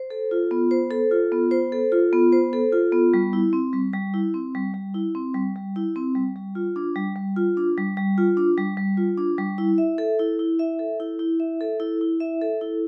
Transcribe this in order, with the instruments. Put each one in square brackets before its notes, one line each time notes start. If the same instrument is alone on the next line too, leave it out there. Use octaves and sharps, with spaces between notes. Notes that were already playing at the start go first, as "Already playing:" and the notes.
Already playing: [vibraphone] C5
A4
F4
B3
C5
A4
F4
B3
C5
A4
F4
B3
C5
A4
F4
B3
G3
E4
C4
G3
G3
E4
C4
G3
G3
E4
C4
G3
G3
E4
C4
G3
G3
F4
D4
G3
G3
F4
D4
G3
G3
F4
D4
G3
G3
F4
D4
G3
E4
E5
A4
E4
E4
E5
A4
E4
E4
E5
A4
E4
E4
E5
A4
E4